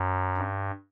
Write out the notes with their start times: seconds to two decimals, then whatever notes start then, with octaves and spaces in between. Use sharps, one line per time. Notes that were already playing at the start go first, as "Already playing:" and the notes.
Already playing: F#2
0.37 G2